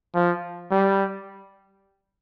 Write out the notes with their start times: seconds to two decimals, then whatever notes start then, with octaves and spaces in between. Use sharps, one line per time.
0.15 F3
0.71 G3